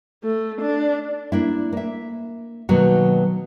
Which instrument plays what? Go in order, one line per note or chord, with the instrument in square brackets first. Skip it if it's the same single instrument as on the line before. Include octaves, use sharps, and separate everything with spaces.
[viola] A3
D4
[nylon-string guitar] A#3 D4 E4
A#3 E5
B2 D#3 F#3 A#3 D#4 F#4